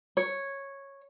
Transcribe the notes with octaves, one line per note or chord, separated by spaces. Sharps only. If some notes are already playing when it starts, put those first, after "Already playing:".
C#5